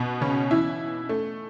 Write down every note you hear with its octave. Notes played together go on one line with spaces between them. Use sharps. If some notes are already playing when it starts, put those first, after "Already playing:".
Already playing: B2 B3
C#3 C#4
E3 E4
A3